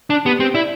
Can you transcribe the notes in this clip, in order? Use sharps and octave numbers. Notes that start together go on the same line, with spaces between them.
D4 A5
B3 G4
C4 G4
E4 D5